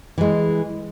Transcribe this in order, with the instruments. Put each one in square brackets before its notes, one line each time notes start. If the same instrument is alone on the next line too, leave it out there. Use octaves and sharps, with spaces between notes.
[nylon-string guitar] E3 G#3